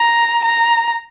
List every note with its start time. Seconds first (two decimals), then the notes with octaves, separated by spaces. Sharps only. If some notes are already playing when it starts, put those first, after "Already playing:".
Already playing: A#5
0.44 A#5